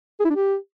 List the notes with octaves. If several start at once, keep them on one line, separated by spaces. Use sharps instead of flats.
G#4
E4
D4
G4